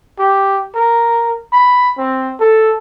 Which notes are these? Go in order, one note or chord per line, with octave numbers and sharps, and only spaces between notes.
G4
A#4
B5
C4
A4